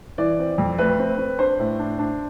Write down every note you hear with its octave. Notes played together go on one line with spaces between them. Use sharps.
E3 D5
C4
F2
A3 B4
C4
C4
D4 C5
A2
D4
D4